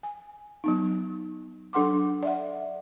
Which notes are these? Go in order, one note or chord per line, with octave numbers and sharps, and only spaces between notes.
G#5
F#3 B3 D#4
F#3 D4 A4 F#5 C6 D6
D5 E5 F#5